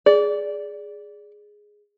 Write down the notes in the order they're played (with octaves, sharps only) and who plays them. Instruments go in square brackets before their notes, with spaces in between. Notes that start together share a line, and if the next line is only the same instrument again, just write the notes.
[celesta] G#4 [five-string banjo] D5